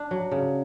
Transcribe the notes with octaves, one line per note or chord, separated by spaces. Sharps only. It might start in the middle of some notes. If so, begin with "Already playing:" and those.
Already playing: D4
F#3
C#3